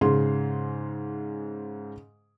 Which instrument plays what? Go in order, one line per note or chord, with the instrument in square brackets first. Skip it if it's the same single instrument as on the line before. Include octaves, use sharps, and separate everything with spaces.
[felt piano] G#2 C#3 G#4 C6